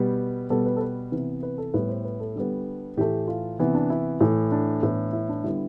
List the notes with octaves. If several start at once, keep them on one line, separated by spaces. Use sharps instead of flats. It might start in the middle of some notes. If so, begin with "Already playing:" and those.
Already playing: B2 G3 B3 G4
B2 G3 B3 A4
B4
A4
B4
C3 E3 B3
B4
A4
A2 G3 B3 B4
C5
B4
A4
D3 G3 B3
A2 E3 A3 G4
F4
C3 E3 B3 E4
D4
E4
A2 E3 A3
D4
A2 E3 B3
E4
D4
D3 G3 B3 E4